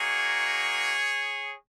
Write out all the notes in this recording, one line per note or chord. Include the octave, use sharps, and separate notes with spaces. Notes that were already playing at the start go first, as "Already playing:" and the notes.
Already playing: A#3 D#4 F#4 G#4 C#5